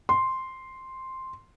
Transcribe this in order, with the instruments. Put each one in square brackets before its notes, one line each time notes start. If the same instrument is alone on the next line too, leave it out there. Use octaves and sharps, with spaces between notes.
[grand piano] C6